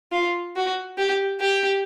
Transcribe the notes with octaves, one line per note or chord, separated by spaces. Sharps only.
F4
F#4
G4
G4